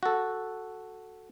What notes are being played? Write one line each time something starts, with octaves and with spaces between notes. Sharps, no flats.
F#4 A4